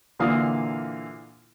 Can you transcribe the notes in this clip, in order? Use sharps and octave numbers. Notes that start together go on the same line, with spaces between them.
A#2 D3 E3 A#3 F5 D#6